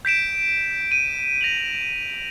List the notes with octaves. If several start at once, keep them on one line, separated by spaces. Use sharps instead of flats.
G6 B6 D7 E7
D#7
A#6 F7 F#7